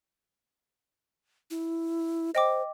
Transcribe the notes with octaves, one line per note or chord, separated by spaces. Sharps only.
E4
C5 D#5 G5 D6